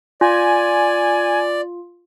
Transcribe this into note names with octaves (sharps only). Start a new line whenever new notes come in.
F4 D5 G#5